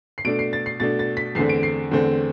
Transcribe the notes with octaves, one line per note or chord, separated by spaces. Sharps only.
C7
B2 A3 D4 D7
C7
A6
C7
B2 A3 D4 A6
A6
B6
E2 D3 A3 C4 C7
D7
C7
E2 D3 A3 C4